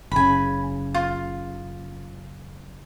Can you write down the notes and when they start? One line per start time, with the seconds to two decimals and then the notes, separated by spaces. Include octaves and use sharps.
0.12 F#1 C#3 G#5 B5
0.94 F4